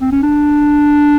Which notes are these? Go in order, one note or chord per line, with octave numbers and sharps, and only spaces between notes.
C4
C#4
D4